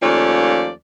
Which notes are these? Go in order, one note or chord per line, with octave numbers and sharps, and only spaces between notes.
D#2 F3 A3 C#4 F4 D5